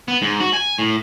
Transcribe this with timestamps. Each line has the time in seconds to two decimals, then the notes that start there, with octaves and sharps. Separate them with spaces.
0.08 B3
0.22 G#2
0.40 F#4
0.53 G#5
0.79 A2